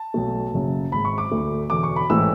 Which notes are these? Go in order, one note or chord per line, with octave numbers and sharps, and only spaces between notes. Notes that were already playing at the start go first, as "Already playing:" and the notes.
Already playing: A5
B1 B2 A3
F#1 F#2 C#3 F#3
G#1 G#2 G#3 B5
C#6
D6
D2 D3 A3
E1 E2 D3 D6
C#6
B5
A1 G#2 E3 A3 E6